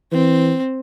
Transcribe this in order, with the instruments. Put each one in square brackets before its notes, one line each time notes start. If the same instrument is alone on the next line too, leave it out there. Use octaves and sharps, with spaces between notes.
[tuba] E3 [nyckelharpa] C4